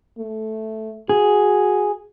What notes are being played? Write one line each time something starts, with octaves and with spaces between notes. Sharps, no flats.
A3
F#4 G#4